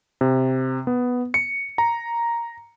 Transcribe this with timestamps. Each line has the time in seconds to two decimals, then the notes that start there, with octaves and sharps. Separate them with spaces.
0.21 C3
0.87 B3
1.34 C#7
1.78 A#5